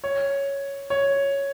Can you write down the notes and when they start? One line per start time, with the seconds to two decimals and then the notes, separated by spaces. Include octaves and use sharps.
0.04 C#5
0.90 C#5